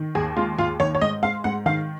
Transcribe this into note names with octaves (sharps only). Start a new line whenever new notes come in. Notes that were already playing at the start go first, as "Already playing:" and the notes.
Already playing: D#3
D#2 G#4
G#3 F4
D#2 F4
D#3 C#5
C#5
G#2 D#5
G#3 F5
G#2 F#5
D#3 F5